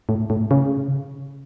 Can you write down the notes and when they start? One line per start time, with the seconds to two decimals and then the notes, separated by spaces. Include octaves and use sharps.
0.09 A2
0.30 A2
0.51 C#3